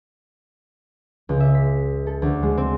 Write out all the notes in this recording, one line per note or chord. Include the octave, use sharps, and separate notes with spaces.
C#2
E5
B6
A4
D2
G#3
C4